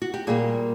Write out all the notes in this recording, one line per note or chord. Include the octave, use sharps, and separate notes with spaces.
F#4
G4
A#2 G3 A#3 G#4